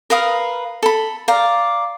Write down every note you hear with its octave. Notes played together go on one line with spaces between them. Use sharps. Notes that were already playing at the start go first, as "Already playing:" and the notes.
A#4 B4 F5 D#6
A4 B5
D5 F5 A#5